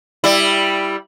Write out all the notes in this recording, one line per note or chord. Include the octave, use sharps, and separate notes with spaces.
G3 E4